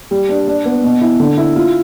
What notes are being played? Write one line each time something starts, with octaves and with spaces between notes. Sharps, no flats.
G3
D4
D4
B3
B2
E4
D3
E4
F4